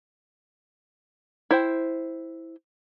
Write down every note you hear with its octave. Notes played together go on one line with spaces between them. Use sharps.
E4 C5 G5